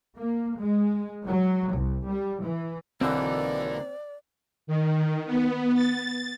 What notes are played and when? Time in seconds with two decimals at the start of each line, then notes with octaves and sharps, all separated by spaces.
0.17 A#3
0.60 G#3
1.28 F#3
1.75 C2
2.08 G3
2.43 E3
3.01 B1 D3 E3 A#3 C4 D#4 D5
4.67 D#3
5.26 B3
5.74 A6